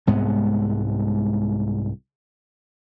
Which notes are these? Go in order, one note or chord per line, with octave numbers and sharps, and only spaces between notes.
C2 G#2 G#3 B3